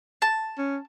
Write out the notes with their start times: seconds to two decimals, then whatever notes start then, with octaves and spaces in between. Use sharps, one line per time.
0.22 A5
0.58 C#4